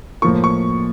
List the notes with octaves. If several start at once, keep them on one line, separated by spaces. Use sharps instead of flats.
A2 F3 A#3 C#6
C#6